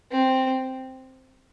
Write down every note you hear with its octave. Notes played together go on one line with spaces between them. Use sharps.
C4